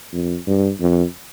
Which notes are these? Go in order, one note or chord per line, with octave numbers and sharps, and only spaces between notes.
F2
G2
F2